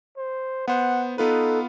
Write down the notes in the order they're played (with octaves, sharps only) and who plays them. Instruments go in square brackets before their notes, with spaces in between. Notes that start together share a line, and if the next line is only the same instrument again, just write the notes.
[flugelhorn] C5
[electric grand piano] B3 C5 [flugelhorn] F#5
[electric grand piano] B3 F4 B4 [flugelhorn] D#4 [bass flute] A4